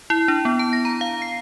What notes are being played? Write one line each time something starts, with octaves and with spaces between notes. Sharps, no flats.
E4
D4
B3
A5
A#6
A#5
F5
C7